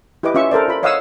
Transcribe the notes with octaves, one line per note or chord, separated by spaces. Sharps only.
E4 G4 B4 D#5 D6
C#4 F4 E5 C#6
A4 A#4 C5 D5
F4 B5
C#5 D#5 F5 F#5 D#6 E6